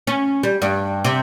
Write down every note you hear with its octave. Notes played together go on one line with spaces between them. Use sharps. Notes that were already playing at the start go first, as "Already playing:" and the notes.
C#4
G3
G2
C3